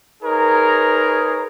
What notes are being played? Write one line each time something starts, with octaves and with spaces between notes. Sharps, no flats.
D#4 G#4 A#4 B4 C#5